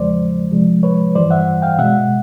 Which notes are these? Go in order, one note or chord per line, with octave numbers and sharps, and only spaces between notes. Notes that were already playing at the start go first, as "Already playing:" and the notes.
Already playing: E2 C#3 F3 G#3 C5 D5
C3 F3 G#3
B4 C#5
G2 E3 G3 C5 D5
E5 F#5
F5 G5
B2 G#3 E5 F#5